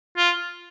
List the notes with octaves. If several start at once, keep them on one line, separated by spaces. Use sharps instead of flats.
F4